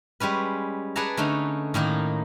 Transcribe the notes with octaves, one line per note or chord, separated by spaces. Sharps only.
G3 G#3 C#4 B4
G#4 B4 D5 F#5 A5 A#5
D3 A3 C#4 D#4
A2 D#3 A#3 D#4